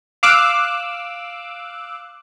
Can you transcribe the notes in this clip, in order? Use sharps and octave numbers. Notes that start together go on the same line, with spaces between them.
F5 D6 E6 F#6